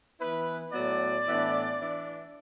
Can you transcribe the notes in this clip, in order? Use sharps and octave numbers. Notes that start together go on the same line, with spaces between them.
E3 B3 E4 B4
A2 F#3 B3 D5
A2 E3 B3 D4
E3 D4